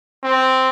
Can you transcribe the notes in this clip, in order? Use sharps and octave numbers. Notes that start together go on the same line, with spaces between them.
C4